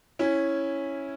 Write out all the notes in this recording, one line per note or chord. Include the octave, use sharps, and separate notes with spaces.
C#4 E4